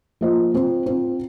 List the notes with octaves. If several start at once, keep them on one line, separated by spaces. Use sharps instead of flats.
F3 A#3 F4 C5 D#5
C4 F4 C5
C4 F4 C5